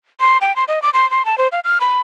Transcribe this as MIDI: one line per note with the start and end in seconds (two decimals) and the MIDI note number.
0.20 0.38 84
0.41 0.55 79
0.56 0.64 84
0.68 0.82 75
0.82 0.90 86
0.94 1.09 84
1.11 1.25 84
1.25 1.37 81
1.38 1.48 72
1.52 1.60 77
1.64 1.78 89
1.80 2.01 83